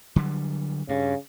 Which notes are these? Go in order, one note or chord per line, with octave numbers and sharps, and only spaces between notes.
D3 F#3 G3
G2 C#3